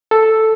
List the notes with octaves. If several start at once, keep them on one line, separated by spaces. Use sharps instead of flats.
A4